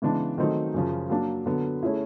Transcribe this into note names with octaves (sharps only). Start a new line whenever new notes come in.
C#3 E3 G#3 B3 D4
D#3 F#3 A3 C4 D#4
F#2 C#3 F3
F#3 A#3 D4
D3 F#3 B3
A3 C#4 E4 G#4